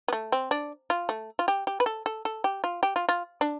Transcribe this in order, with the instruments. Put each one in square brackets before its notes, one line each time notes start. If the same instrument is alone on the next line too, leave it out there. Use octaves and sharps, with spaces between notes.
[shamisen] B3
A3
C4
D4
F4
A3
F4
G4
G4
B4
A4
A4
A4
G4
F4
G4
F4
F4
D4